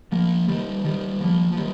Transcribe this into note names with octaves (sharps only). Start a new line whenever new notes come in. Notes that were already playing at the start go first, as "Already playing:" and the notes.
F3 A#3
D#3 G3
D#3 G3
F3 A#3
F3
D#3 G3